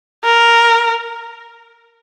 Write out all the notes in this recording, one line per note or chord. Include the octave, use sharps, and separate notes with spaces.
A#4